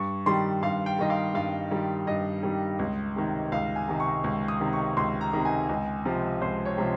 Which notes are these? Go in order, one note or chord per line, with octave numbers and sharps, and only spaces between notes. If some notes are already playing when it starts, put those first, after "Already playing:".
Already playing: G2 C#6
D#3 G3 C6
G2 F5
G5
D#3 G3 D#5
F5
G2 F5
D#3 G3
G2 D#5
D#3 G3
C#2
C3 D#3
C#2 F5
G#5
C3 D#3
C#6
C#2
D#6
C3 D#3
C#6
C#2 C6
A#5
C3 D#3
G#5
C#2
C3 F3
C#2 C5
C#5
C3 F3